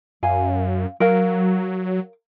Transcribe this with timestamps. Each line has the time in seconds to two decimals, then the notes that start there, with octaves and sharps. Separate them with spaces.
0.23 F#2 F5 G#5
1.00 F#3 A#4 F5